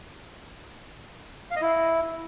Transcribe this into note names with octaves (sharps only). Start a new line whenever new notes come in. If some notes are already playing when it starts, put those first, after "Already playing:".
F5
D#5
E4